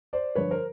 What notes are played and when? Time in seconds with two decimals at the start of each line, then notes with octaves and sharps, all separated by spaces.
0.13 C5 D5
0.35 G2 D3 F3 B4 C#5
0.50 A#4 C5